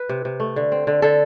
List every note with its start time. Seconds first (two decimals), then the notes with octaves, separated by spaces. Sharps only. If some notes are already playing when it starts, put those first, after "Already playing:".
Already playing: B4
0.09 C3
0.25 C3
0.40 A3
0.56 D3
0.72 C4
0.87 D3
1.02 D3 A4